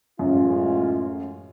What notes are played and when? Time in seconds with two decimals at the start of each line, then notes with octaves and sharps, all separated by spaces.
0.19 F#2 A2 E3 G#3 C#4 F4